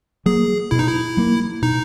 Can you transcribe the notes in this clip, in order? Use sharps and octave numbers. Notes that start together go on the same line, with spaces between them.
F#3 A#3 G#4
B2 E4
D#4
E4
F#3 A#3
B2 D#4